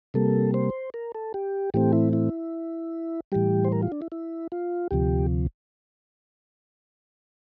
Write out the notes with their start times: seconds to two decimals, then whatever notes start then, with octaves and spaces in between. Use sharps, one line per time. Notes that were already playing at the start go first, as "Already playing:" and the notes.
0.14 C3 G3 A#3 A4
0.54 C5
0.94 A#4
1.14 A4
1.34 G4
1.74 A2 E3 A3 C4 G4
1.93 E4
2.13 E4
3.32 A2 E3 G3 G4
3.64 C5
3.72 A#4
3.82 F4
3.92 D4
4.02 E4
4.12 E4
4.52 F4
4.91 D2 C3 F3 G4